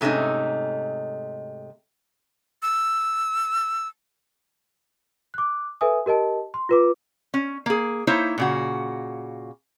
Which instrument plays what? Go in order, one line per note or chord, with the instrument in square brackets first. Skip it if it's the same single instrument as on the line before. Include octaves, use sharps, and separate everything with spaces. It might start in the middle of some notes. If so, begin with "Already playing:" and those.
[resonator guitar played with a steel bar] G#2 C3 A3 C#4 D#4
[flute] E6
[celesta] D6 F#6
A4 B4 E5 G#5 D#6
G4 A#4 D#5 A5
C6
F4 B4 D6
[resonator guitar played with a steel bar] C#4
A#3 G#4
A#3 D#4 E4 C5 C#5
A#2 C#3 F#4